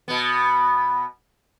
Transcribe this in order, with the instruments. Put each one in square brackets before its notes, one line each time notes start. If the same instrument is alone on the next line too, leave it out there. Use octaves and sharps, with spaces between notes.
[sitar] B2 B3